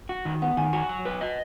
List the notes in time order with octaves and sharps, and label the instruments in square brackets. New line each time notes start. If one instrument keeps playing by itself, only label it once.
[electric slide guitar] F#4
D#3
[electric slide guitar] B3 [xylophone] F#5
[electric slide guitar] D#3 [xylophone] G#5
[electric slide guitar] F#4 [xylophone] G#5
[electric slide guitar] F#3
B4
D#5